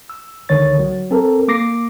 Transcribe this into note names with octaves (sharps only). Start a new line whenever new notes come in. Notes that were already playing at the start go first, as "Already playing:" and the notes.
E6
C#2 D3 D#3 C#5 A6
F#3
C4 A4 A#4
A#3 D6 A#6 C7